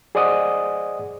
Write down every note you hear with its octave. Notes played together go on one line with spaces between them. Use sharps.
G#4 C5 D5 D#5 F#5 D#6